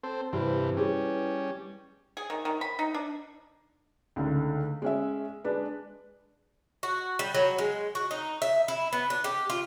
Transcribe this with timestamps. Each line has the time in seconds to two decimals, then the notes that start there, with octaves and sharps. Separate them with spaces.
0.03 C4 A4 C5
0.33 G2 C3 E3 E4 G4 B4 C5 B5
0.77 G3 C#4 G#4
2.17 G#4
2.30 D#3
2.45 D#3
2.61 B5
2.79 D#4
2.94 D4
4.16 C#2 D3 D#3 A3
4.82 G#3 C#4 E5
5.44 G#3 D4 B4
6.83 F#4
7.19 G3
7.34 F#3
7.58 G#3
7.95 F#4
8.11 D#4
8.42 E5
8.68 E4
8.93 B3
9.10 D4
9.24 G4
9.50 F4